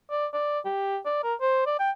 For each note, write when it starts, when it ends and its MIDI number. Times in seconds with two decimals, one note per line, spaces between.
0.11 0.26 74
0.33 0.59 74
0.65 0.98 67
1.05 1.22 74
1.23 1.34 70
1.41 1.64 72
1.66 1.75 74
1.79 1.90 79